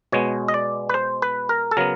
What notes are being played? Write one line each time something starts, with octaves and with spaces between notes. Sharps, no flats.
B2 G#3 B3 C#5
D#5
D5
B4
C5
B4
A#4
A4
C#3 F#3 B3 A#4